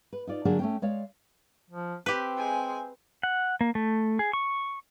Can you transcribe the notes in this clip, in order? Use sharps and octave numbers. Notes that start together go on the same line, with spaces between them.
B4
D#4 F4 D5
D3 F#3 A#3 D4 G#4
A3 C#4 G5
G#3 C#5 D5 F5
F3
C4 G4 B4
G#3 G#5
F#5
A#3
A3
G#4
C#6